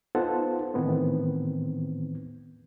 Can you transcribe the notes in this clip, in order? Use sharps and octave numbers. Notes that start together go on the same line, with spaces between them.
B3 D#4 F4 A4 C5 F#5
A2 D#3 E3 B3 C4